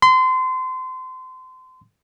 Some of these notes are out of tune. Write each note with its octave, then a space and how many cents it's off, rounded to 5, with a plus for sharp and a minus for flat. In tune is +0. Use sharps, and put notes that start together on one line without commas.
C6 -30